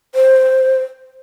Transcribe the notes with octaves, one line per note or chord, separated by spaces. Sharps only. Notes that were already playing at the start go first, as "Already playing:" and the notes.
C5